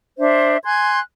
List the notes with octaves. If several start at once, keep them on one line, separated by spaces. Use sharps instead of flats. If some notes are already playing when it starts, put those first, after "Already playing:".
D4 C5 E5
G#5 C6 F#6 G#6